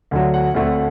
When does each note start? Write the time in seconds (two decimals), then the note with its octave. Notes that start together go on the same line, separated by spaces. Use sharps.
0.11 D2 D3 F#3
0.34 F#5
0.54 D2 D3 A3 C4